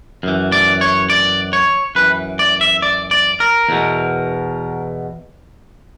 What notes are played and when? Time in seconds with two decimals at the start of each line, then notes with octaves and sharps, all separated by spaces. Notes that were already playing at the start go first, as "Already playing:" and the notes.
0.23 F#2 E3
0.52 D5
0.81 C#5
1.10 D5
1.53 C#5
1.95 F#2 E3 B4
2.39 D5
2.61 E5
2.82 D5
3.11 D5
3.40 A#4
3.69 E2 B2